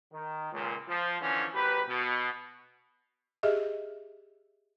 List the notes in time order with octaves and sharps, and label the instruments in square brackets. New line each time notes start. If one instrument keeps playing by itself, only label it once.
[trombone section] D#3
C#2 A#2
F3
D3 E3 F3 C#4
G#1 G4 B4
B2
[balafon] G4 G#4 D#5 E5